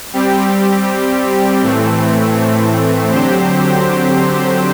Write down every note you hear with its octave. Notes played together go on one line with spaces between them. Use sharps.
G3 C4 G4
A2 E3 A3 C4
D3 F#3 C4 G4 C5